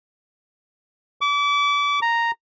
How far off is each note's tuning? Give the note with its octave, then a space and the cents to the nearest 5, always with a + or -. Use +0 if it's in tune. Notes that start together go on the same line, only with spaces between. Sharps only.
D6 -35
A#5 -5